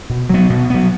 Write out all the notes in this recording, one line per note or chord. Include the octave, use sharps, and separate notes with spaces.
B2
F#3 B3
B2
F#3 B3